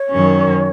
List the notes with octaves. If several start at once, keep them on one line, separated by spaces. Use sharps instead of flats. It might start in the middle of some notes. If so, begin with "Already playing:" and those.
Already playing: C#5
F#2 D#3 F#3 C#4